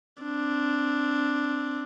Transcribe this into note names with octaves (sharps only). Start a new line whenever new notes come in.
C4 D4